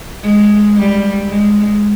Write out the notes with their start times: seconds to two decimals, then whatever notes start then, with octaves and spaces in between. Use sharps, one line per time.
0.23 G#3
0.77 G3
1.29 G#3